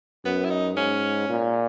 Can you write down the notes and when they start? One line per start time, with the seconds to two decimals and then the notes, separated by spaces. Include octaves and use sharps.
0.25 F#2 B3
0.45 E4
0.50 D#4
0.76 G#2 C#4
1.29 A#2